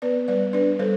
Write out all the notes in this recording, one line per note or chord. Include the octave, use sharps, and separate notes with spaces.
B3 B4 D5
G3 B4 D5
D4 B4 D5
G3 A4 C5